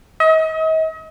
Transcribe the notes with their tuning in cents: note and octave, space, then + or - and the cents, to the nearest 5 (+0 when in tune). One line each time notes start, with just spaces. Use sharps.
D#5 +40